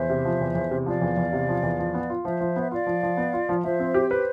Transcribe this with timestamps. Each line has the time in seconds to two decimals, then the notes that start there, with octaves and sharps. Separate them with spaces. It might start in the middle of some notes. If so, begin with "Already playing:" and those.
Already playing: E2 C5 E5
0.10 C3
0.25 F3
0.41 E2
0.55 E2
0.71 C3
0.86 F3 D5 F5
1.02 E2
1.17 E2
1.33 C3
1.48 F3
1.63 E2
1.79 F3
1.94 B3
2.10 F4
2.25 F3 C5 E5
2.41 F3
2.56 B3 E5
2.71 F4 D5 F5
2.87 F3
3.03 F3
3.17 B3
3.33 F4
3.49 F3
3.64 F3 C5 E5
3.80 C4
3.94 G4
4.11 B4 C5